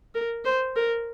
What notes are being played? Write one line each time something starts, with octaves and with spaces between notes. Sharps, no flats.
A#4
C5
A#4